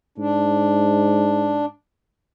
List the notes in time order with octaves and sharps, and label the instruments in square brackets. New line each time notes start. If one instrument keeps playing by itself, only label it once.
[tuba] G#2 [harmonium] D4